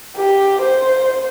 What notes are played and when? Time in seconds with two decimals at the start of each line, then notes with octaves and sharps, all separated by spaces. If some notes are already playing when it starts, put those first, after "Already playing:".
0.16 G4
0.62 C5